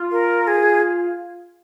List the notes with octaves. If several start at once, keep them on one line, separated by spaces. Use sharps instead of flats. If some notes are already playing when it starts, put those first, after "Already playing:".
Already playing: F4
A#4
G#4